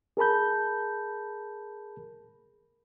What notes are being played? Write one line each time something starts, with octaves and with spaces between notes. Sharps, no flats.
G#4 A#4 A5 B5 G6